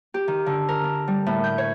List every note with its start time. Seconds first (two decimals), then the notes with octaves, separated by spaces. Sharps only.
0.14 G4
0.28 D#3
0.46 D3
0.68 A#4
0.84 D4
1.08 G3
1.26 A2
1.44 G6
1.58 C#5